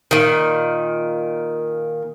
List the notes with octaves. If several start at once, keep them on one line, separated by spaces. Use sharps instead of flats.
A#2 D#3